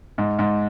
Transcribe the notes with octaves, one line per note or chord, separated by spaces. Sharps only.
G#2
G#2